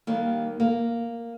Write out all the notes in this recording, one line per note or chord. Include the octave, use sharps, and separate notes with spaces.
D#2 D#3 G3 A#3
A#3